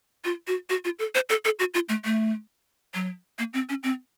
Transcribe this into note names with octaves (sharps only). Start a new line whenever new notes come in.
F4
F#4
F#4
F4
A4
C5
A4
A4
F#4
F4
A3
A3
F#3
A#3
C4
C#4
C4